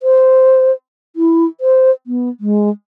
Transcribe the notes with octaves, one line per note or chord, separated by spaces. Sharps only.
C5
E4
C5
B3
G#3